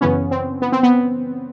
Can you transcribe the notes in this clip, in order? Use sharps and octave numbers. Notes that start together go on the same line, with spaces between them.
F#2 C#3 E3 B3 C#4
C4
B3
C4
B3